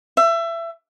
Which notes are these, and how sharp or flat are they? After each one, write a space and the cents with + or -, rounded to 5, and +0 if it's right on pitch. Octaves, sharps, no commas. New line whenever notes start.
E5 +25